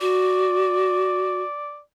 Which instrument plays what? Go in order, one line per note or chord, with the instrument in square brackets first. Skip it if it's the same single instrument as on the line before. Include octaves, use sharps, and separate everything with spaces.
[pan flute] F#4 [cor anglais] D5